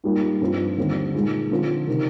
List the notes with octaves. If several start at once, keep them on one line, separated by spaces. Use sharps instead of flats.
G#2 G3 A#3 F4
G2 F3 C4 F4
D#2 D3 G3 C4
A#2 G#3 D#4
D3 F3 C4 F4
C3 D#3